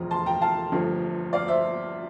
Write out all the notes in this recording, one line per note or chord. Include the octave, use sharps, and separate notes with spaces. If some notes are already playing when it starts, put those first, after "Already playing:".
Already playing: E1 D2 D3 F3 A#5
A5 C6
G5 A#5
F5 A5
G1 G2 F3 A3
D5 F5
C5 E5